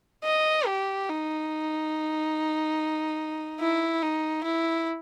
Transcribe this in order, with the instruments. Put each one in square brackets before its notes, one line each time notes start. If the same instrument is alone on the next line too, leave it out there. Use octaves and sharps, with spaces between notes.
[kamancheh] D#5
G4
D#4
E4
D#4
E4